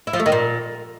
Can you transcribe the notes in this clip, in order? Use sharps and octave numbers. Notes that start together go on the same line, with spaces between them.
E4
F3
A3
D#3
A#2